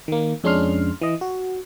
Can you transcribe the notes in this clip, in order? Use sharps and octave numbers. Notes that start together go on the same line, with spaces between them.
D#3 A#3
F2 G#3 C#4 D4 C6 F6
E3 D#5
F#4